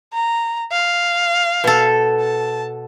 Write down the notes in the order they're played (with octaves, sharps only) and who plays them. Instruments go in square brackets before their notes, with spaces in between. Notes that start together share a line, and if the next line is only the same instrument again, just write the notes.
[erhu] A#5
F5
[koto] B2 A4
[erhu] A5